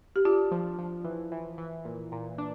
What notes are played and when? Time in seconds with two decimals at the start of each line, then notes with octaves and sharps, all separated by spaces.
0.16 G4
0.25 D4 F4
0.51 F3
0.79 F3
1.04 E3
1.32 E3
1.58 E3
1.85 A#2
2.12 A#2
2.38 D4